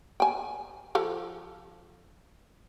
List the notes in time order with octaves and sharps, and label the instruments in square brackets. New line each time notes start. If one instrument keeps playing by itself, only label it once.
[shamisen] G5 G#5
F3 A4 F5